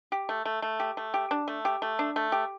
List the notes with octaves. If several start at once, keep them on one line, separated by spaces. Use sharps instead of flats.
G4
A3
A3
A3
G4
A3
G4
D4
A3
G4
A3
D4
A3
G4